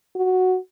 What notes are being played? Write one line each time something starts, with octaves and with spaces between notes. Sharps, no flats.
F#4